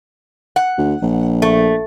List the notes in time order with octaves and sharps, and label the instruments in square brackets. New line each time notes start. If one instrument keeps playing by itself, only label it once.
[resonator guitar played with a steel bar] F#5
[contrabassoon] D2
A#1
[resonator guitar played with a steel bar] A3